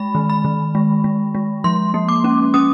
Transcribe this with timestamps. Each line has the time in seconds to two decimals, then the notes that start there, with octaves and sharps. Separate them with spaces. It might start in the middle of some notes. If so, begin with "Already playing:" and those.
Already playing: G#3 B5
0.15 D#3
0.30 B5
0.44 D#3
0.75 G#3
1.04 G#3
1.35 G#3
1.64 F3 C6
1.94 A#3
2.09 D6
2.24 C#4
2.54 C#4 D#6